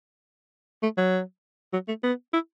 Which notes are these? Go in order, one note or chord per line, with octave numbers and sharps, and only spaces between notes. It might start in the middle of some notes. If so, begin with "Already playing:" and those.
A3
F#3
F#3
A3
B3
E4